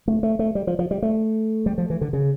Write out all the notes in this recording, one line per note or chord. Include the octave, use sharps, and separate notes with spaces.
A3
A3
A3
G3
F3
F3
G3
A3
G3
F3
E3
D3
C#3